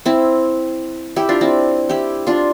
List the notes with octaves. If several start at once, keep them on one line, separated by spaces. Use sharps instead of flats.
C4 E4
E4 G4
D4 F4
C4 E4
E4 G4
D4 F4